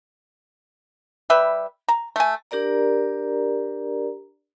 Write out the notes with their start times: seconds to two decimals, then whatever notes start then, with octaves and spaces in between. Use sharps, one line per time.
1.30 G3 B4 E5
1.89 A#5
2.16 A3 G#5
2.51 D4 G4 A#4 D5 A#5